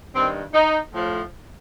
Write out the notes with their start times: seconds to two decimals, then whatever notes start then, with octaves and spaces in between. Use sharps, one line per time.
0.14 G2 D#3 C4
0.53 D#4
0.93 A2 F3